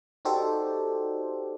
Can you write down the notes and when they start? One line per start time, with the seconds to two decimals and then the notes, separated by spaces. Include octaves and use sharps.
0.25 D#4 F#4 G4 A4 C5 D5